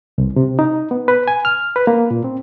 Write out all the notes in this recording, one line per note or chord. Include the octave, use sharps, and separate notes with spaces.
C2
C3
D#4
B3
B4
G#5
F6
B4
A#3
A#2
C4